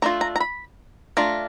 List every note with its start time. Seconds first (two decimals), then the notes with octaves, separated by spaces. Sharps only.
0.02 A3 D4 F4 A#5
0.21 A#5
0.36 A#5
0.40 B5
1.17 A3 D4 F4 A#5